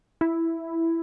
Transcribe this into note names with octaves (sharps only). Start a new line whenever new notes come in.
E4